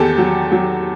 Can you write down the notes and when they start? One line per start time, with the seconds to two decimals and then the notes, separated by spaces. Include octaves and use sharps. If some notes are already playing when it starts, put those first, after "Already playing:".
Already playing: E2 D#3 G4 A4
0.18 F#3
0.52 F#3